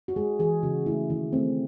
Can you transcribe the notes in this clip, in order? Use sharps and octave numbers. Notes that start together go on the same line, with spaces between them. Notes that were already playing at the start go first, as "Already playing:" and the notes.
F#4
G#3 G#4
E3 G#4
C#3 F#4
A3 E4
D#3 E4
A3 C4